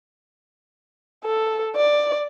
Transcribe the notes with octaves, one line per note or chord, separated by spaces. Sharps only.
A4
D5